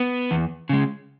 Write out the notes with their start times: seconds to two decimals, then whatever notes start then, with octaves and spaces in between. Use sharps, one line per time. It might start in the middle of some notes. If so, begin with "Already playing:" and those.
Already playing: B3
0.31 E2
0.69 C#3 G#3